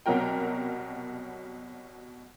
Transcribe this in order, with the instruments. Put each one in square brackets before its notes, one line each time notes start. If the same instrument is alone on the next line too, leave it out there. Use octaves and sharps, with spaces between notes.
[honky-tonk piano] C2 B2 F#3 F#4 A#4 G5